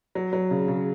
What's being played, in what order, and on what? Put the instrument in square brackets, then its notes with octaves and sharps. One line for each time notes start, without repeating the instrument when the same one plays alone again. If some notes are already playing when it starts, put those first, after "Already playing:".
[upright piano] F#3
F#3
C#3
C#3